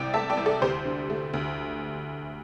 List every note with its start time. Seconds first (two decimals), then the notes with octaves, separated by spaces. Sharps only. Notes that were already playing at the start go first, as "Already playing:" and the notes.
Already playing: C2 C3 D5 G5
0.14 A3 E5 A5
0.30 D5 G5
0.37 C2
0.46 A4 D5
0.62 D2 G4 C5
0.85 D3
1.10 A3
1.33 D2